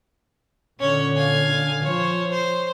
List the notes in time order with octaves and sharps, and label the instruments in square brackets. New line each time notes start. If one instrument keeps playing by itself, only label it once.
[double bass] A#2 D3 [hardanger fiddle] C#4 C#5
[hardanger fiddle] F5 G#5
[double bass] F3 [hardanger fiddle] C5 C#5
[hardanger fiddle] C5